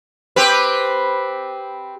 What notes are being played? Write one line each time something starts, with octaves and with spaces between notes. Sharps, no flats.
C4 G4 B4